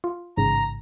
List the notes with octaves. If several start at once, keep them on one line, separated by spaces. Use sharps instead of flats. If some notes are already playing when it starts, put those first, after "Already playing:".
F4
A1 G#2 C#3 A#5